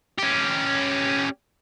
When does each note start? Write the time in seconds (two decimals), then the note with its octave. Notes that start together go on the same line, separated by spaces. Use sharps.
0.19 C#4 G4